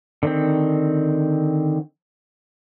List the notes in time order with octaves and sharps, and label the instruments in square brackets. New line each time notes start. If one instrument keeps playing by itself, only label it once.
[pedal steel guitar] D3 D#3 C4